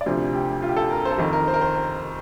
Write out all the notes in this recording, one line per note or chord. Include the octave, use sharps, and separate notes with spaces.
D5
D2 C3 F3 C5
G4
F4
G4
A4
A#4
C5
A4
F2 D#3 A#4
A#4
C5
A#4
C5
A#4